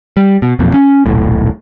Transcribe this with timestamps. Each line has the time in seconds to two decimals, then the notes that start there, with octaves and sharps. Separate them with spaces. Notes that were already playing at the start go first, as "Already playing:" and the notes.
0.17 G3
0.42 B2
0.59 E1 B1 F2 A#2
0.74 C#4
1.06 D#1 B1 A2